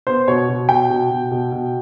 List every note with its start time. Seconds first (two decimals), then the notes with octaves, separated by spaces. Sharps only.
0.07 B3 C5
0.28 B2 C#5
0.49 B2
0.69 B2 G5
0.90 B2
1.11 B2
1.31 B2
1.52 B2